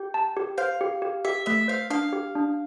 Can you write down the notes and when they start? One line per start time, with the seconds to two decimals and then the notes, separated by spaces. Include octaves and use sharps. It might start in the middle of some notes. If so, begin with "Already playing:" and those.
Already playing: G4 G5
0.14 A5
0.37 G4
0.58 C5 F5
0.81 G4
1.02 G4
1.25 G4 E5
1.46 A3 E5
1.68 C5 F5
1.90 D4 F5
2.13 G4
2.35 D4